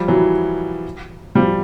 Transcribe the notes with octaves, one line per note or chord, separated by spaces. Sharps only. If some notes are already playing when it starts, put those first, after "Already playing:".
Already playing: F3 G3
E3 F#3
F3 G3